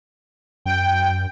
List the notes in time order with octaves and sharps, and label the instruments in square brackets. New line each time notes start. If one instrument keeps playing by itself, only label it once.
[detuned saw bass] F#2 [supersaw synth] G5